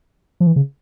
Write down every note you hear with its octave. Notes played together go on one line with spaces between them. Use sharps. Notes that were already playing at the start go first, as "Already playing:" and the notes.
F3
E3
C#3